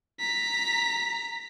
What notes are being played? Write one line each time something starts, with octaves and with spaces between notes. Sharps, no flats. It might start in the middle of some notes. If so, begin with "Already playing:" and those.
A#5 B6